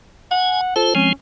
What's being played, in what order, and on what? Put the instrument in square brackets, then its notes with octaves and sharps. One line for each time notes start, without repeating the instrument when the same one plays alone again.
[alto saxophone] F#5 [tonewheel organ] G#5
[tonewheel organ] F4 C5 [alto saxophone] A4
[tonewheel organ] F3 G#3 C4 [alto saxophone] C#4